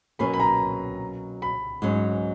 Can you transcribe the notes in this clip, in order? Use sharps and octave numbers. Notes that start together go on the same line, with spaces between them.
B2 F#3 A#3 C#4 B5
B5
A#5
B5
G#2 F#3 C#4